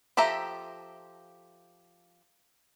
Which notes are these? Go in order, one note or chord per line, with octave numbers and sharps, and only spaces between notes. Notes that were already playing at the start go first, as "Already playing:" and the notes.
F3 G4 A4 E5 A#5